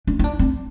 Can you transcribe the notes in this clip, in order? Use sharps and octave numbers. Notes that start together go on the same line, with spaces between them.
D4
D#4
D4
C4